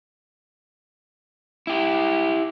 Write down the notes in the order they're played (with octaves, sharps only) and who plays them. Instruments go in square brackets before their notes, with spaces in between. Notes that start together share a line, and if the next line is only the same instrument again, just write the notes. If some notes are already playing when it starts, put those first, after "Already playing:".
[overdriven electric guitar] E4 G4